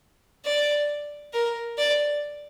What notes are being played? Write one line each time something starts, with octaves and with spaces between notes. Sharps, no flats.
D5
A#4
D5